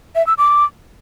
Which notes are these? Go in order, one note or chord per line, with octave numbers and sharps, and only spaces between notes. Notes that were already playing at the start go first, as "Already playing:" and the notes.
E5
E6
D6